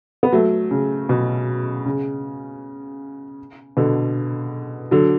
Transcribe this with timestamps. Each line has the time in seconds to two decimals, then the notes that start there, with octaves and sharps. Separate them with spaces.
0.23 B3
0.32 F#3 A3
0.71 C#3
1.09 B2
1.86 C#3
3.77 B2 D3
4.91 D3 F#3